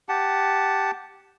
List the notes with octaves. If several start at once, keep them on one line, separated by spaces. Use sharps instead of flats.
G4 F#5 A5